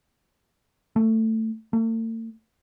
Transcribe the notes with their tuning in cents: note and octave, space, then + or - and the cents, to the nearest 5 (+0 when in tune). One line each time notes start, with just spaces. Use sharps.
A3 +15
A3 +45